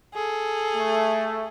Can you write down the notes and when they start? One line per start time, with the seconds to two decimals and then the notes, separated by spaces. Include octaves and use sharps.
0.14 G#4 A4
0.76 A3